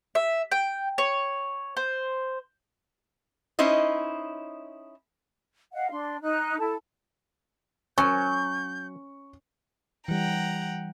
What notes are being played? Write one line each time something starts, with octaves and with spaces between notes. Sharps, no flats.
E5
G5
C#5
C5
C#4 D#4 E4 C5 D#5
D#5 F5 F#5
D4 C6
D#4 F#6
E4 A4 A5
F#3 C#4 C#6 G6
E3 G3 F#5 G5 A#5